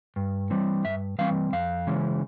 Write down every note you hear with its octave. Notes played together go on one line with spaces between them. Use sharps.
G2
E3 G3 C4
G2 E5
E3 G3 C4 F5
F2 F5
C#3 E3 G#3 C#4